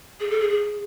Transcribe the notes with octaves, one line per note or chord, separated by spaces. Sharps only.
G#4
A4
G#4
G#4